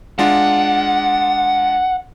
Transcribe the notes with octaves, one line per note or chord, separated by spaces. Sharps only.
G#3 D4 F4 F#5